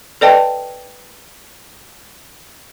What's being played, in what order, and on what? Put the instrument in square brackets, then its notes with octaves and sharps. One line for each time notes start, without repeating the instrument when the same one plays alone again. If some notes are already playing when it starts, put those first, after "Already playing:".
[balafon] A4 B4 D5 D#5 G5 A5